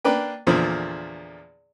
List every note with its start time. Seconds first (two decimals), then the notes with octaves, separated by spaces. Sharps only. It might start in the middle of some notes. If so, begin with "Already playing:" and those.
0.04 A#3 D4 B4 G5
0.47 E2 A#2 D3 F3